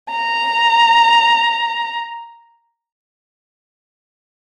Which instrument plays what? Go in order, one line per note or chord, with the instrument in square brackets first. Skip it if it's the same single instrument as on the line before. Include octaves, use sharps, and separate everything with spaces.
[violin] A#5